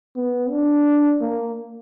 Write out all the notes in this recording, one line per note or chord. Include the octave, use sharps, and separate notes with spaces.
B3
D4
A#3